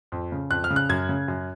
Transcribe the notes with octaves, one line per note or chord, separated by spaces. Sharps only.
F2
C#3
F2 F#6
F6
C#3
F#6
F#2 G#6
C#3
F#2